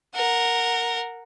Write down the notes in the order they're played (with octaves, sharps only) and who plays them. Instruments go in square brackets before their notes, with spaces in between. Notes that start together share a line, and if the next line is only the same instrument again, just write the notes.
[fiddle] A#4 F#5